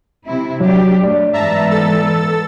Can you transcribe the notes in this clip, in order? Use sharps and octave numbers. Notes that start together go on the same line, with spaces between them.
C3 E4
F#3 D4 G4
A3 D5
G#2 E3 B3 E5 A5 A#5
A4 E6 A6